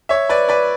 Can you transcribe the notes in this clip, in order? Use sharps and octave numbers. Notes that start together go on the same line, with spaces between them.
C#5 E5
B4 D5
B4 D5